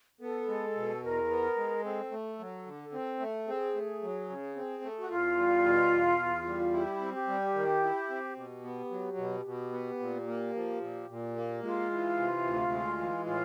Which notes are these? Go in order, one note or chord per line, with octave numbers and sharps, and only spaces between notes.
B3 A4
G#3
B2
E2 A#4
B3
G#3
C4 A4
A3
F#3
D3
C4
A3
C4 G#4
A3
F#3
C#3
C4
A3
F#4
E2 F4
G3
B2
E2
E2
G3
E4 G4
C4
G4
G3
D#3
E4
C4
B2 G4
B3
F#3
B2
B2
B3
A#2
A#3
F3
A#2
A#2
A#3
G#3 F4
E3
C3
D2
G#3
E3
A2 F4